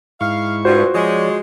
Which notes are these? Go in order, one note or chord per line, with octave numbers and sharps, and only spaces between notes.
G#2 E4 F5 C#6
G2 F4 F#4 C5
F3 G#3 C#5 D5